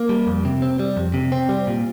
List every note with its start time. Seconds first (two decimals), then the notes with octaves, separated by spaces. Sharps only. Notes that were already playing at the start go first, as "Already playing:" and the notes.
Already playing: A#3
0.09 G3
0.27 F2
0.45 C3
0.62 C4
0.79 G3
0.97 F2
1.14 C3
1.32 C4
1.49 G3
1.67 A#2